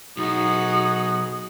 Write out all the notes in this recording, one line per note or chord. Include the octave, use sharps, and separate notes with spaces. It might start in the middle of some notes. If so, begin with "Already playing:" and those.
B1 D#4 F#4 G#4 D#6